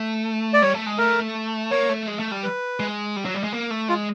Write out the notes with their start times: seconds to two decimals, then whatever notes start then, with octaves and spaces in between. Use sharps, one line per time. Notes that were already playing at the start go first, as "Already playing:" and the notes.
Already playing: A3
0.54 D5
0.62 G3 C#5
0.74 A3
0.86 G#3
0.98 A3 A#4
1.71 A#3 C#5
1.89 A3
2.08 G#3
2.20 A3
2.31 G3
2.44 B4
2.80 G#3
3.16 G3
3.25 F#3
3.35 G3
3.44 G#3
3.53 A#3
3.71 A3
3.88 G#3 F4